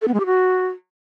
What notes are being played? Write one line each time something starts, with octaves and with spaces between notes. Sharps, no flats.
A4
B3
G#3
G4
F#4